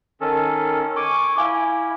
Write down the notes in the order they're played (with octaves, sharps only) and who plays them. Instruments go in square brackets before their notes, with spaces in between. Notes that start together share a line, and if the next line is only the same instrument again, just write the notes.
[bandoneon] D#3 C#4 A4
[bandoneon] G#5 D6 [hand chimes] C#6
[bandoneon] E4 [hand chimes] F5 G#5 D6